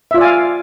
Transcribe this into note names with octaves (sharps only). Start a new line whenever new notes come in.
F4 D5 E5 F5 G#5